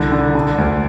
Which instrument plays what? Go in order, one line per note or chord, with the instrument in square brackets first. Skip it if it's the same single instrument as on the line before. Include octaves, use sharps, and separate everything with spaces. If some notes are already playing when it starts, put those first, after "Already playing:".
Already playing: [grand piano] C2 D3
D3
D3
D2